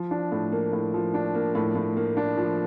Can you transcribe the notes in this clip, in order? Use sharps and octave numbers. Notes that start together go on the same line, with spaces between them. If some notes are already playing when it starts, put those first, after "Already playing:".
Already playing: F3
D4
A2
A#3
A2
F3
D4
A#3
A2
A2
A#3
D4
F3